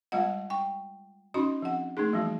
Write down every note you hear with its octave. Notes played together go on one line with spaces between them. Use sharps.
G3 G#3 B3 F4 D#5 F#5
G5 C#6
C#4 D#4 F#4 D#5 B5 C6
F3 C4 F#5
A3 A#3 D4 D#4 G#4
E3 F3 G3 B3 F#4